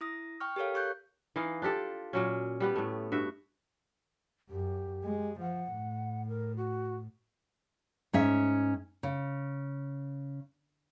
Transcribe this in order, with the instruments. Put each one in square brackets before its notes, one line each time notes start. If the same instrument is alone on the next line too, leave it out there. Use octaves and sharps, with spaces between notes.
[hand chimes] E4 D#6 A#6
G5 C#6 F6
G4 A4 A#4 C#5 F5
G4 C#6 F#6 G6
[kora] E3 D#4 F5
D4 F4 G4 A4
A#2 F#3 C#4
G3 B3 G4
A2 A3
G2 F#4 E5
[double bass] F#2 [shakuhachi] G4
[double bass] G#3
[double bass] F3 [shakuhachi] F#5
[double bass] A2
[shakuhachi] A#4
F#4
[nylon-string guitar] G#2 C#4 E5
C#3